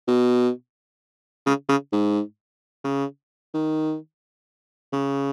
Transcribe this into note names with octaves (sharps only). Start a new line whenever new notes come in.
B2
C#3
C#3
G#2
C#3
D#3
C#3